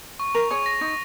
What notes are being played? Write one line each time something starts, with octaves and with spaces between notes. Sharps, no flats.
C#6
A#4 F7
G#4 C#5 C#6
A#6
D#4 C#6